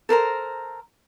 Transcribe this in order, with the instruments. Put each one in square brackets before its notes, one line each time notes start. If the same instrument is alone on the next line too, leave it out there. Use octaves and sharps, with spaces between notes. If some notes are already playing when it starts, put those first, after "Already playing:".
[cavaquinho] A4 A#4 C5 A#5